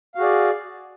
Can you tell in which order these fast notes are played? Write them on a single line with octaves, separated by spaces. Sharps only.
F5 F#4 G#4 D5